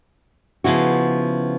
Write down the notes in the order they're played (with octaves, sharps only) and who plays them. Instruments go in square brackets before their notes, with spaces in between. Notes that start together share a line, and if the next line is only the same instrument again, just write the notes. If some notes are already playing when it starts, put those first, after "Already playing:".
[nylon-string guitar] C#3 F3 B3 E4 F#4